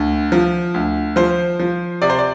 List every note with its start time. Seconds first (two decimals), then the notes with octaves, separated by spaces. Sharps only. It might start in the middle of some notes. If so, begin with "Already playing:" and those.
Already playing: D2
0.32 F3
0.74 D2
1.16 F3 C5
1.60 F3
2.02 C3 D5
2.10 C5
2.18 D5